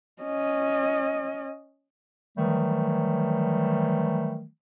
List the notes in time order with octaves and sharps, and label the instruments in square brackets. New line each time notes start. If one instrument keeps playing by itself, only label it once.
[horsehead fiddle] C#4 D#5
[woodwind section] D#3 E3 F#3 G3 A3